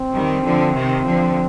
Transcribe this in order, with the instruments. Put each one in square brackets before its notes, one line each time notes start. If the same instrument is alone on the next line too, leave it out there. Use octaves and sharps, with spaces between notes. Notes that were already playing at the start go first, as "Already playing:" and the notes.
Already playing: [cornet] C4
[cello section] D#3 G3
D3 F3
C3 D#3
D3 F3